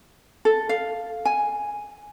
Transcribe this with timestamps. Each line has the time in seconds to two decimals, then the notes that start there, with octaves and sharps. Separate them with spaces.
0.45 A4
0.69 F5
1.25 G#5